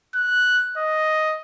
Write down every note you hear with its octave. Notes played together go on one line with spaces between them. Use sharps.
F#6
D#5